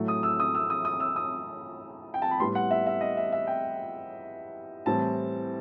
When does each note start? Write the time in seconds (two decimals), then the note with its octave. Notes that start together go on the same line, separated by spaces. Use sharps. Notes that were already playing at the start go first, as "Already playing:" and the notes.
Already playing: A2 F#3 A3
0.08 D#6
0.23 E6
0.40 D#6
0.55 E6
0.70 D#6
0.85 D#6
1.00 E6
1.16 D#6
2.14 G5
2.22 A5
2.31 B5
2.40 A2 G3 B3 C6
2.55 F#5
2.71 E5
2.86 E5
3.01 D#5
3.17 E5
3.32 E5
3.47 G5
4.86 A2 E3 G3 C4 A5